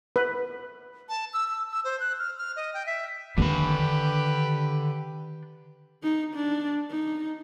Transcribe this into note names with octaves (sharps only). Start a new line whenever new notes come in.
B4
A5
E6
E6
E6
C5
F#6
F6
F6
D#5
G5
E5
D3 D#3 D4 G4 B4 B5
D#4
D4
D#4